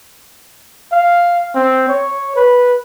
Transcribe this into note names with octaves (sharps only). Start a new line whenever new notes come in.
F5
C4
C#5
B4